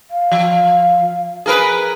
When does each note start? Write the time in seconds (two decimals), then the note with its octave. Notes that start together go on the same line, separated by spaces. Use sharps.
0.11 F5
0.32 F3
1.46 G#4 A#4 B4